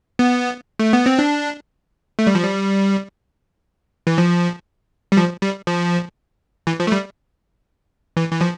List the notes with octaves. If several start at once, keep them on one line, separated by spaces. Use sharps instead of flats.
B3
A3
B3
C4
D4
A3
G3
F3
G3
E3
F3
G3
F3
G3
F3
E3
F3
A3
G3
E3
E3
F3